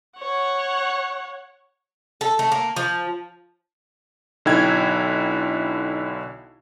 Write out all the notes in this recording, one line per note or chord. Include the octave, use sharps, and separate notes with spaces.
C#5 F#5
A4
A3
A#3
F3
B1 D3 D#4 E4 G5 G#6